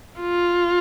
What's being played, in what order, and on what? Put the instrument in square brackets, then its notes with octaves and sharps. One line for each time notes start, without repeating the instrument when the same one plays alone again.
[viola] F4